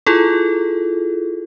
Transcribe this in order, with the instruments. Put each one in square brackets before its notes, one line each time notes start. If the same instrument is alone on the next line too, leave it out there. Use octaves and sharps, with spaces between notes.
[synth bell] E4 F4 G#4 A4